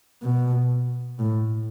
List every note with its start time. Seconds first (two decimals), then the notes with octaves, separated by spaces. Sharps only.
0.22 B2
1.19 A2